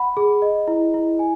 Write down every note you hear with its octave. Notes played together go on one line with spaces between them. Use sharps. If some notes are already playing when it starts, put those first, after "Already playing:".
Already playing: F#5 B5
G#4
D#5
E4
E4
G#5